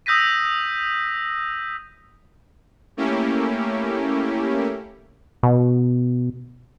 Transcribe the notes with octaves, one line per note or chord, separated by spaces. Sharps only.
D#6 E6 G6 A#6 B6 D#7
A3 A#3 C#4 E4 G4
B2